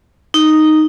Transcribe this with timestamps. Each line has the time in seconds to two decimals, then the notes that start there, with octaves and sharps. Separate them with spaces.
0.34 D#4